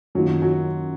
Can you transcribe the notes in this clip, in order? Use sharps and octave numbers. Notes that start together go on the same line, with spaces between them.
F#2 D#3 F#3 A#3 F4
F#3